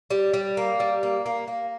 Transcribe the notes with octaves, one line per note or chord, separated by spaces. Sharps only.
G3
G3
A#3
G3
A#3
A#3
A#3